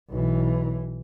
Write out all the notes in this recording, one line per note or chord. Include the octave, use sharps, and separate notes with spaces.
B1 E3